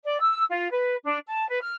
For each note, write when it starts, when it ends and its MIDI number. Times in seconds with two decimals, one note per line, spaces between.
0.04 0.19 74
0.20 0.43 88
0.50 0.71 65
0.71 0.95 71
1.03 1.17 62
1.26 1.48 81
1.49 1.60 71
1.61 1.74 89